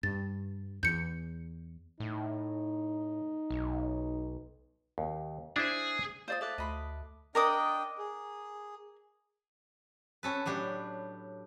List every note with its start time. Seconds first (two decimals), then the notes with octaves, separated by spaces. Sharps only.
0.03 G2 A6
0.83 E2 G6 C#7
2.00 A2 D#4
3.50 B1
4.98 D#2
5.56 D4 E4 G#4 C5
6.28 F4 C5 D5 D#6
6.41 A4 E5 D6 F#6
6.58 D2 D#5 B5 C6
7.35 D4 A#4 D5 D#5 G5 D#6
7.98 G#4
10.23 C#4 A4 B4
10.46 A2 F#3 D4 G4